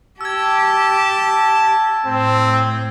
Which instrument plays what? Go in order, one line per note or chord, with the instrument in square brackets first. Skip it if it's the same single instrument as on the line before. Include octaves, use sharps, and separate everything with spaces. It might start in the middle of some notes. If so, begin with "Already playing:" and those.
[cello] G4 [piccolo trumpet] A5 [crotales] E6 G#6
[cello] A2 [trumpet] C4